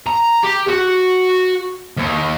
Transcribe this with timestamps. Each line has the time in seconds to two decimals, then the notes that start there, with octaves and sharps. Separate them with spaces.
0.06 A#5
0.43 G4
0.68 F#4
1.97 D#2